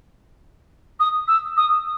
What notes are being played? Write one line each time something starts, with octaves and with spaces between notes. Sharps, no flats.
D#6
E6
D#6